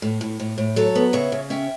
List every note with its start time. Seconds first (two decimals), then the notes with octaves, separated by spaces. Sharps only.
0.02 A2
0.21 A2
0.40 A2
0.58 A2
0.76 F#3 A4 C#5
0.95 B3
1.13 C#3 C#5 E5
1.32 C#3
1.50 C#4 E5 G5